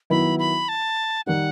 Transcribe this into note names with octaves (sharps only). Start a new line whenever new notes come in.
D#3 F#3 B3 E4 B5
B5
A5
D#3 G3 D#4 F#5